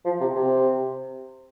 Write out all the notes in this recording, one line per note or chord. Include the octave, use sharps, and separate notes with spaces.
F3
C3
C3